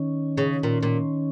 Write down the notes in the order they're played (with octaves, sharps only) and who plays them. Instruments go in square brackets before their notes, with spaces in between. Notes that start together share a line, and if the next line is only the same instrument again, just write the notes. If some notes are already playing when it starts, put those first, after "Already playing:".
Already playing: [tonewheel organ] D#3 C#4
[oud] C#3
A#2
A#2